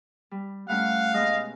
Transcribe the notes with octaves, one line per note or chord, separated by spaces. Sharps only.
G3
G3 A3 C#4 F5 F#5
B2 G#3 D#5